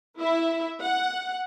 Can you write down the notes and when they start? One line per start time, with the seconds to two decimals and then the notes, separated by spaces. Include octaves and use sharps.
0.21 E4 E5
0.82 F#5